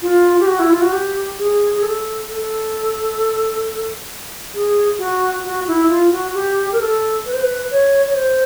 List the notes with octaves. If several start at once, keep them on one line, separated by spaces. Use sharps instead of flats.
F4
G4
F#4
E4
F4
F#4
G4
G#4
G#4
A4
A4
G#4
F#4
F#4
E4
F4
F#4
G4
A#4
A4
B4
C5
B4
C#5
C#5
C5